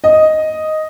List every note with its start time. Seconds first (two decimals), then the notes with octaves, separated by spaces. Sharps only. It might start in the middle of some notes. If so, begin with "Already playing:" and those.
0.04 D#5